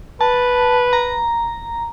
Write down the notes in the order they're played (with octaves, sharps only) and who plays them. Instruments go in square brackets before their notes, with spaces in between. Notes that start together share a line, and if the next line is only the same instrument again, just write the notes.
[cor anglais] B4 [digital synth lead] A5
[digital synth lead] A#5